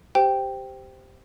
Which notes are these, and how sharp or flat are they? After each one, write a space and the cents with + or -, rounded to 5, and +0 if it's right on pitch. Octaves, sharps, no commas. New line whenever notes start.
G4 +0 C5 -10 G5 +0